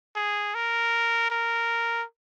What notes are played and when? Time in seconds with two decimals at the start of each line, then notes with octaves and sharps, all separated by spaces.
0.16 G#4
0.55 A#4
1.30 A#4